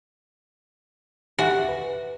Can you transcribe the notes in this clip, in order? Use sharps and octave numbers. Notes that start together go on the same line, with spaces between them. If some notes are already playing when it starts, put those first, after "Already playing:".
F#4 G4 E5 G#5
B4